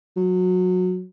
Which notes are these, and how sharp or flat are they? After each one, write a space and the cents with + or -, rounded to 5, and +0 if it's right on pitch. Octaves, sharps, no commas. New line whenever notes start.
F#3 -20